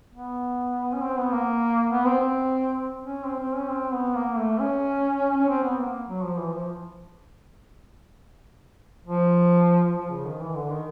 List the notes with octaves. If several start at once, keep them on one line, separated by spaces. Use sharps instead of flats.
B3
C#4
C4
B3
A#3
B3
C4
C4
C#4
C4
C4
C#4
C4
B3
A#3
A3
C#4
C#4
C4
B3
A#3
F#3
F3
E3
F3
F3
F3
C#3
D#3
E3
D3
D#3